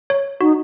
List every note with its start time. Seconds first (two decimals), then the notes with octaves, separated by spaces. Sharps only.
0.10 C#5
0.41 D#4 F#4